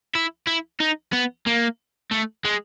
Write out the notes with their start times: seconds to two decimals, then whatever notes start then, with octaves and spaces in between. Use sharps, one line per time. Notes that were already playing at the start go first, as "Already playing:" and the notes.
0.15 E4
0.47 E4
0.80 D#4
1.13 B3
1.47 A#3
2.11 A3
2.45 G#3